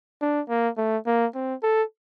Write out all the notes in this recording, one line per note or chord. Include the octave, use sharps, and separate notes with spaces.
D4
A#3
A3
A#3
C4
A4